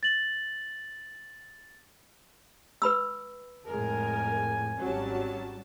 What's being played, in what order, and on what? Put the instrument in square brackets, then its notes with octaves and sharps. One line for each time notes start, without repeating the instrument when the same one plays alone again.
[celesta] A6 F#7
[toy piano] B4 B5 E6
[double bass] F2 A2 [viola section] G#3 A#4 [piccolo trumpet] G#5
[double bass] G#1 C#4 [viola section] F#3 G3 A5